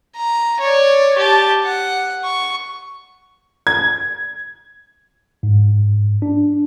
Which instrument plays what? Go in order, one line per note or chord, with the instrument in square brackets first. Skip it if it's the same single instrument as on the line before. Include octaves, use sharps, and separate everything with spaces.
[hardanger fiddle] A#5
C#5 D5
G4 A5
F#5
C#6
[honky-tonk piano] G#6
[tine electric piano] G#2
D4